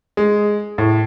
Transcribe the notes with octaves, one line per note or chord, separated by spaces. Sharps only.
G#3
A2